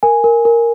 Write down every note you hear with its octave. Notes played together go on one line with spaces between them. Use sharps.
A#4 G#5
A#4
A#4